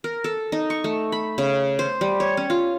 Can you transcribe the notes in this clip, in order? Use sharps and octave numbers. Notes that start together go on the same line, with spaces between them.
A#4
A4
D#4
C#6
A3
B5
C#3
C5
G3
C#5
C#4
F4